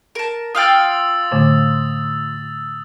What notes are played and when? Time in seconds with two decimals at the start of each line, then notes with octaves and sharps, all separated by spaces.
0.15 A#4 A5
0.55 F4 F5 G5 D#6 E6 A6
1.31 A2 D3 A3